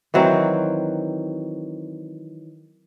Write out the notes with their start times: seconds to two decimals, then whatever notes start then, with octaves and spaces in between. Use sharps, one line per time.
0.14 D#3 E3 F#3 C4